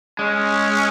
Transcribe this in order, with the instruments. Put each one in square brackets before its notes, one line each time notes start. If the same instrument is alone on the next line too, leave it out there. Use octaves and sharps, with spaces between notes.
[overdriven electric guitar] G#3 [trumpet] C#4